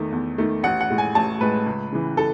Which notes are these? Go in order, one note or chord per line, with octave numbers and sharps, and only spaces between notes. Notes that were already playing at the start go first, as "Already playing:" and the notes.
Already playing: E2 D#3 A3
E2
D#3 A3
A1 F#5
F#5
A2 G#3
G#5
A1 A5
A2 G#3 B4
C#2
C#3 E3
A4